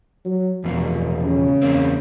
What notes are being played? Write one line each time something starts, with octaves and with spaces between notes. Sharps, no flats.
F#3
F1 E2 B2 F3
C#3
E2 A#3 C4